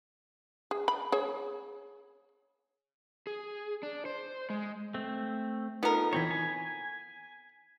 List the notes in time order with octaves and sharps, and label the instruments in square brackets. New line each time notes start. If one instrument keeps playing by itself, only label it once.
[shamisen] G#4
B5
G#4 C#5
[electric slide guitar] G#4
D4
C5
G#3
[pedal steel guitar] A3 C4
[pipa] B3 A#4 [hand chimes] D#4 F4 A4
[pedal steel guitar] E3 C4 C#5 [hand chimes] G#6 B6
[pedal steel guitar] G#5